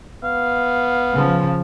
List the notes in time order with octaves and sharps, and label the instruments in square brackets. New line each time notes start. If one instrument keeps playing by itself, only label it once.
[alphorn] B3 [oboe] F5
[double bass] C#3 F3